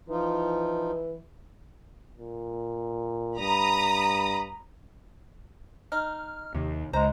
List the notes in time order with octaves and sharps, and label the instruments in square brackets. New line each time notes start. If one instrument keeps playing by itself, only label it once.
[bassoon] E3 [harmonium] F3 D#4 F4
[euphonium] A#2
[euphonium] G2 [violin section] A#5 B5 D#6
[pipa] D#4 [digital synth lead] F6
[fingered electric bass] D#2 [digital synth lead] C3
[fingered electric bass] C#2 [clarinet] G#3 [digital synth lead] C5 [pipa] A#5